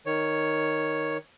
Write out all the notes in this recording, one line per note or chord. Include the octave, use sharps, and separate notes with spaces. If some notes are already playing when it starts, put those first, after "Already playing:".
D#3 C#5